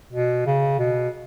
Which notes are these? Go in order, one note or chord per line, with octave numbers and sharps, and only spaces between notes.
B2
C#3
B2